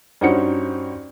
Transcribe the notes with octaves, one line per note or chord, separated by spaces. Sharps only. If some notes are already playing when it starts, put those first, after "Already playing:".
G2 C#4 D#4 F#4 C5 C#7